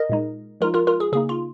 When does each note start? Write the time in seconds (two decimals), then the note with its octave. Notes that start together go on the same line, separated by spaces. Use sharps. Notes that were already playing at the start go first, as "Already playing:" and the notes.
Already playing: A#4 D#5
0.09 A#2 G#3 D#4
0.61 F3 G#3 D#4 F4 A#4
0.74 F4 A#4
0.87 F4 A#4
1.00 G#4
1.12 C#3 A#3 D#4 G#4
1.29 F4